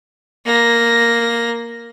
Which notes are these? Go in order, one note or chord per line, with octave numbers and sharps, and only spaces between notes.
A#3 A#6